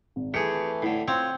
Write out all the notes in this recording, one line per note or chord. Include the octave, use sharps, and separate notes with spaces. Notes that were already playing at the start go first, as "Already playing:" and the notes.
G#1
E3 A3 G4 G#4 C#7
A2 D3 E4
C4 F4 C#5